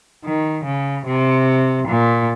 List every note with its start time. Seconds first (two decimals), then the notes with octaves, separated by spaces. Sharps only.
0.25 D#3
0.65 C#3
1.06 C3
1.88 A#2